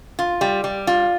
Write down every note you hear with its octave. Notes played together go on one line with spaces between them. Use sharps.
F4
G3
G3
F4